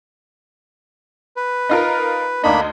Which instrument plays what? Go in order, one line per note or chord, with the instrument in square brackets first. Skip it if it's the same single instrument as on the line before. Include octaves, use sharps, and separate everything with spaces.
[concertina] B4
[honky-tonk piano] D#4 F4 A#4
[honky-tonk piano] D2 D#4 [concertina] A#3 D4 B5